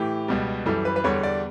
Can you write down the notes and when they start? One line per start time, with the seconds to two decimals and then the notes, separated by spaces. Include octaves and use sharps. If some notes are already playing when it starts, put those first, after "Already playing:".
Already playing: A2 E3 G4
0.28 C#2 B2 G3
0.66 F#2 E3 G3 A4
0.85 B4
0.96 B4
1.04 E2 D3 G3 C#5
1.23 D5